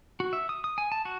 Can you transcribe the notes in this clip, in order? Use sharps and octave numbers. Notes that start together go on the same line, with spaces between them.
F#4
E5
D#6
D#6
G#5
A5
F#4